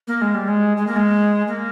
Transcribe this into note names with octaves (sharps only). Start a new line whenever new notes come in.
A#3
G#3
G3
G#3
G#3
A#3
G#3
A#3